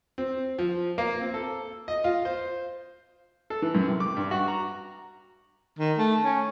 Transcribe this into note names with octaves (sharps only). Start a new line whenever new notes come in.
C4
F3
A#3
C4
A4
D#5
F4
C5
A4
E3
F#2
C3
D6
G2
F#4
A#5
D#3
A3
C#4